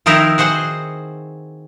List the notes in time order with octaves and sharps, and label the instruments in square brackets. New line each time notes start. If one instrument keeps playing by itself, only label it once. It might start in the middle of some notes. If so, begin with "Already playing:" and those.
[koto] D#3 F3 C4 D#4 E4 A#4
F#4 G#4 C5 F#5